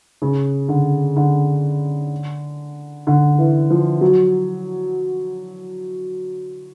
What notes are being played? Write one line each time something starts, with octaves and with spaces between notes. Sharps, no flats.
C#3
D3
D3
D3
E3
F3
F#3